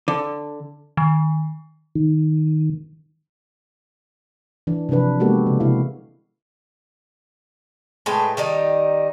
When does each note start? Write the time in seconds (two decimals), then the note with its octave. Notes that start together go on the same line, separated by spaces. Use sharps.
0.08 D3
0.97 D#3
1.95 D#3
4.67 E3 D4
4.89 C3 F3 F#3 D4 B4
5.20 G#3 A#3 B3 F#4 G4 A4
5.47 C#3
5.60 C3 E4 F5
8.06 A2 G#3 B4 G5
8.37 D#3 G3 D#4